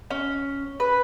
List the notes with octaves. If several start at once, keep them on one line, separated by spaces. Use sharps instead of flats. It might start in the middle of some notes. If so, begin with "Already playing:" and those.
C#4
B4